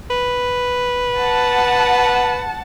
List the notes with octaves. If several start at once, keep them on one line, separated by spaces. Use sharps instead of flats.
B4
F#5 A5